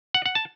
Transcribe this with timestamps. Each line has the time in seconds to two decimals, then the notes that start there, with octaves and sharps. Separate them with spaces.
0.14 F#5
0.26 F#5
0.35 A5